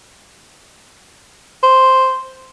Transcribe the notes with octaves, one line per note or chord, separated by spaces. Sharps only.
C5